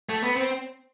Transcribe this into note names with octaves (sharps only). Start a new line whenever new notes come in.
A3
B3
C4